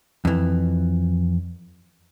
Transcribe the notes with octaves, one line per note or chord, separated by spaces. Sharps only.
F2 E3